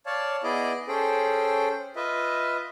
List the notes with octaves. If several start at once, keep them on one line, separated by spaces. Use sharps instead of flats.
C#5 D5 F5 A5
B3 E4 G#4 D5 D#5 D6
C#4 G#4 A4 C5 G5
F4 B4 D#5 E5